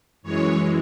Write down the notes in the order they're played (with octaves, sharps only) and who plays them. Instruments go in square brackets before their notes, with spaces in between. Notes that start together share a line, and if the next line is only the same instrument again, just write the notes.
[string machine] F#2 E3 G#3 C#5